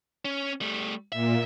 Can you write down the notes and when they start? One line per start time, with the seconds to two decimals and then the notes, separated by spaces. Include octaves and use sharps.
0.25 C#4
0.61 G3 A3
1.12 A#2 E5